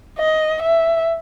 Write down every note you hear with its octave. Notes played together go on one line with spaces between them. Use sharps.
D#5
E5